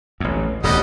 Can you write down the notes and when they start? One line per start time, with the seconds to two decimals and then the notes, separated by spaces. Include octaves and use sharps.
0.20 A1 E2
0.63 D#1 A1 D2 G3 B3 D#5